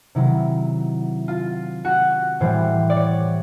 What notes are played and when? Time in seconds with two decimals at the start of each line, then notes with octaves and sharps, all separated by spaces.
0.15 C3 D#3 F#3 E4
1.28 F4
1.85 F#4
2.40 A2 E3 G3 C5
2.90 D5
2.96 C#5